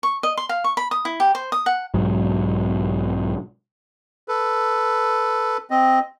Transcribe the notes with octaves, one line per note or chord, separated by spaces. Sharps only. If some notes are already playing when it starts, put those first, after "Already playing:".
C#6
D#5
C6
F5
C#6
B5
D#6
E4
G4
C5
D#6
F#5
B1 G#2 F#3
A4 B4
C4 D#5